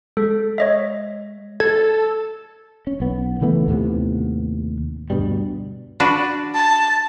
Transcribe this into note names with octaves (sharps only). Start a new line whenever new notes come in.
G#3 A4
C#5 D#5 E5
A4 G#6
C#4
B1 B3
C#3 E3 A3 B3
D#2 A2 C3 B3
D2 G2 B2 G3
D4 F#4 B4
A5